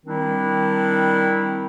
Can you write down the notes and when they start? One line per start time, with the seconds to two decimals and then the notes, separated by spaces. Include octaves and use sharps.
0.06 D#3 G3 C4 D4 E4